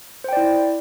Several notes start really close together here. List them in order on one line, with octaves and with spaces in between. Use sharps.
C5 G5 D5 E4